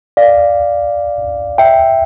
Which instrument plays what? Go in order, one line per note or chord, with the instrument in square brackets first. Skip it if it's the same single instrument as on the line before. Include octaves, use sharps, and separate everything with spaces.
[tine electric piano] D5 F5
E5 G5